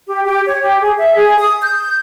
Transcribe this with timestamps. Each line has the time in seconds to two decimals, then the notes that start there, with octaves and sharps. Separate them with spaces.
0.09 G4
0.26 G4
0.47 C#5
0.61 G4
0.81 G#4
0.97 E5
1.15 G#4
1.38 D#6
1.61 G6